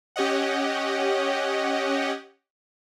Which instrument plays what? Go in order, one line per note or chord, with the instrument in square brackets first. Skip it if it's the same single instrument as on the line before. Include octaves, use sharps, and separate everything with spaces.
[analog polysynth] C#4 G4 C#5 D#5 F#5